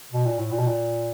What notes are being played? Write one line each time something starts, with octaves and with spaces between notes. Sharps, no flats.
B2
A#2
A2
A#2
B2
A#2